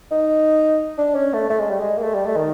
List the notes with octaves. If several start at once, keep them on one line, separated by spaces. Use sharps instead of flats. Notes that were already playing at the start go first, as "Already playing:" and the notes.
D#4
D4
C#4
A3
A3
G#3
G3
G#3
A#3
A3
G3
A3
D#3